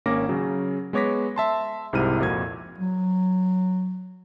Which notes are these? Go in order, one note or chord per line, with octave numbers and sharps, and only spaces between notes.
G#1 A#3 C#4 D6 A#6
C#3 F#3 C#4
G#3 B3 C#5 D6 A#6 B6
E5 A5 C6
C2 G#2 C3 E4 F6 D#7
F2 A#2 F#4 G#6
F#3